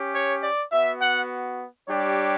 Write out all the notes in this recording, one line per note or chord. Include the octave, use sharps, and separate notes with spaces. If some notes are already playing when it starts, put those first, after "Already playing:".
Already playing: C#4 G4
C#5
D5
B3 F#4 E5
F#5
G3 D4 G4 C#5